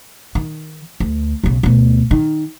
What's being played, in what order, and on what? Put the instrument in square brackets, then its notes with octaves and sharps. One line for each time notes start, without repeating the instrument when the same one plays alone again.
[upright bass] D#3
D2
B1 C#3
D2 B2
D#3